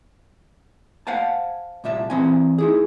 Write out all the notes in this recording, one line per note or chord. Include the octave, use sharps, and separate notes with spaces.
C5 F5 F#5 G#5 A5
C2 A#2 E5 A5
E3 C4 G#5
D#4 E4 G#4